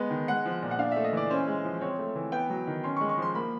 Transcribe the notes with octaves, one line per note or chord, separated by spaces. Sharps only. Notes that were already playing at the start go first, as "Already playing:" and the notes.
Already playing: G#3 B3
D#3
G#3 F#5
F3
A#2
F#5
D4 F5
A3 E5
D#5
E3 D5
C#4 C5
G#3
F3
C4 C#5
A3
E3
B3 G5
F#3
D#3
C#4 C6
C#6
G#3
C#6
F3 C6
A#3 B5